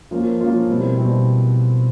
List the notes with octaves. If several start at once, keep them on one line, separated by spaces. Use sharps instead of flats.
F3 A#3 C#4 F4 A#4
F3 A#3 C#4 F4 A#4
B2 G3 C4 E4
B2 G3 C4 E4